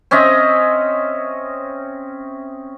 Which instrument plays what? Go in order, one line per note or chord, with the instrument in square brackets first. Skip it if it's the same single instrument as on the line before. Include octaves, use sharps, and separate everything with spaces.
[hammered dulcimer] C4 C#4 D#5 E5